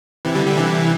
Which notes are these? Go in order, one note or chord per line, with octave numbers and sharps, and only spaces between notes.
C3 E3
D3 G3
D3 G3
C3 E3